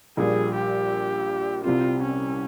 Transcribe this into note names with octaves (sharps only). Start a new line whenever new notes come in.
A#1 A#2 G3 G#4
G4
C2 C3 G3 C4 F4
C#4